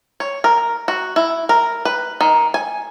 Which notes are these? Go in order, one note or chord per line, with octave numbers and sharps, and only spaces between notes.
C#5
A#4
F#4
E4
A#4
B4
D#3
G#5